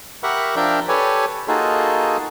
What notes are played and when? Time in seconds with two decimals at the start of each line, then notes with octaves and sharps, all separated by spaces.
0.23 G4 A#4 E5 F#5 B5 C#6
0.56 F3 D4 A#4 D5 E5 G5
0.89 G4 A4 B4 C#5 G#5
1.48 A#3 D#4 F4 F#4 G#4 A4